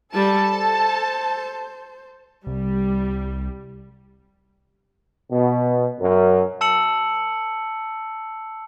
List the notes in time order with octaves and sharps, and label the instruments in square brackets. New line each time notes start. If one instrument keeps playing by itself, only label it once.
[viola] G3 [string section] A4 A5
[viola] C5
[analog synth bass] C2 [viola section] G3
[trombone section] B2
F#2
[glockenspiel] A5 E6 C#7 F#7